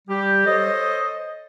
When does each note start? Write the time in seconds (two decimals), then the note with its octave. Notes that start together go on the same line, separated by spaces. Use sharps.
0.08 G3 G4
0.46 A4 C5 C#5 D#5